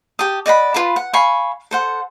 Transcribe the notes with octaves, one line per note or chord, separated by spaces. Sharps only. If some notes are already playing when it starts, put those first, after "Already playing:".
G4 A5 D#6
D5 D#5 F#5 B5
F4 B4 A5 B5
F#5
F5 G#5 B5 C#6
A4 C5 F#5